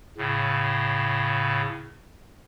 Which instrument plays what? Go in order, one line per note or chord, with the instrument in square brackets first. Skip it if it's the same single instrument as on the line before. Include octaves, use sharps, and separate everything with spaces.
[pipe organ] A2 C#3